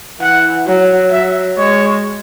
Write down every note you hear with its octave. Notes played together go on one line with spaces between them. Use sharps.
E3 F#5
F#3
F#3 E5
G#3 C#5